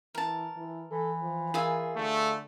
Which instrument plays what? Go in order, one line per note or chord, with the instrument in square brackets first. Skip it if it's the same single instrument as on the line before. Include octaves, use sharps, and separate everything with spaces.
[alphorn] E3 [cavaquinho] A#4 A5
[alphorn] E3
[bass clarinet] E3 [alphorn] A4
[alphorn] F3
[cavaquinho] F4 G#4 E5 [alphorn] A#4
[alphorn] D3 [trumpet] A3